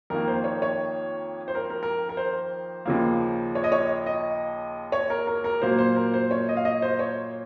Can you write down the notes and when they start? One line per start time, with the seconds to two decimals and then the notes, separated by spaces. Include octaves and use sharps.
0.10 F2 D#3 A#3 A#4
0.28 C5
0.44 C#5
0.62 C#5
1.48 C5
1.55 A#4
1.70 A#4
1.83 A#4
2.09 A#4
2.17 C5
2.85 D#2 C#3 F3 A#3
3.55 C#5
3.64 D#5
3.72 C#5
4.06 D#5
4.92 C#5
5.10 A#4
5.27 A#4
5.44 A#4
5.62 A#2 F#3 A#3 C5
5.79 C5
5.96 A#4
6.14 C5
6.31 C#5
6.49 D#5
6.57 F5
6.65 D#5
6.82 C5
6.99 C#5